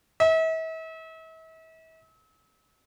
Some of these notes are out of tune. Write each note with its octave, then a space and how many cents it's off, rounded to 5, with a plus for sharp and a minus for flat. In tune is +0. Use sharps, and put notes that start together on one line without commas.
E5 -40